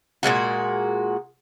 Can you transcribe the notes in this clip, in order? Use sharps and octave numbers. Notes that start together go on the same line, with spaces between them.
A#2 D3 G#3 F#4